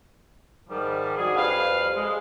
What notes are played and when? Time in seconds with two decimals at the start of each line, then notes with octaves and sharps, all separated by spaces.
0.69 G#2 D#3 F3 G3
1.18 D4 F#4 G#4
1.36 F2 G3 B4 F5
1.96 G#3